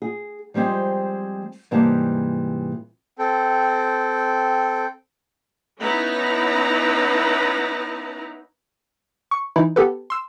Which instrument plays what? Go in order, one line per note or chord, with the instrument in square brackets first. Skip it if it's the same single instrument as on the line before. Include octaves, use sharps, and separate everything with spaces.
[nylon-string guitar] G#4
F3 G3 G#3 C4
G#2 C3 E3 G3 A#3 A5
[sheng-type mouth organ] C4 A4 G5
[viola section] B3 C#4 D#4 E4 B4 A#5
[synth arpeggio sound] C#6
E3 D#4 E4
B3 G4 A4 B4
C6 E6